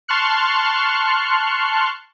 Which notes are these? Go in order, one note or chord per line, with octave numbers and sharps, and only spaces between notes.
A5 C6 C#6 F6 F#6 C#7